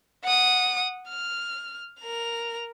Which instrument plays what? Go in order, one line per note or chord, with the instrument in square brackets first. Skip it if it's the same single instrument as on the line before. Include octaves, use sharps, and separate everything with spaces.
[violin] F#5 D#6
F6
A#4 F7